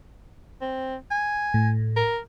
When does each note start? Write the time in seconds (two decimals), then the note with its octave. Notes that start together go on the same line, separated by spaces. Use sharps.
0.61 C4
1.11 G#5
1.54 A2
1.96 A#4